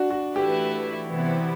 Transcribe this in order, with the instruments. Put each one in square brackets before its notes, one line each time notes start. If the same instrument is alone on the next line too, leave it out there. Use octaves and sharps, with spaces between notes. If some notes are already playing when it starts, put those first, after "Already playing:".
Already playing: [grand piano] D4 F#4
F#4
[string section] E3 A3 E4 B4 [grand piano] G4
[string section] C3 E3 B3 E4